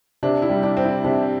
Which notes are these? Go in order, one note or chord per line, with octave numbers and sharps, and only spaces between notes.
C3 D4
E4
G3
D4
C4
E4
C3 D4